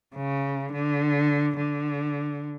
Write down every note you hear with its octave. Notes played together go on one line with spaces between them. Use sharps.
C#3
D3
D3